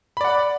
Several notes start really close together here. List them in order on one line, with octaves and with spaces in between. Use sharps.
B5 D5 F#5